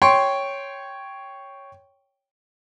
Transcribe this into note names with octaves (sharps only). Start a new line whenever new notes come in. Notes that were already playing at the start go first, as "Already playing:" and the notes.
C#5 G5 C6 C#6